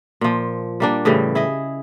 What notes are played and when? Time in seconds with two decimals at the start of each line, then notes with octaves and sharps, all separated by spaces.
0.21 A#2 F3
0.80 G3 A#3 D4
1.05 A2 C#3 E3 G3
1.35 E4 G#4 D#5